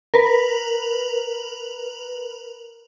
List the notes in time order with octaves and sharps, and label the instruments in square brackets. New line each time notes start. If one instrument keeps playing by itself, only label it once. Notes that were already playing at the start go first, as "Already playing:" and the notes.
[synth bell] A#4 B4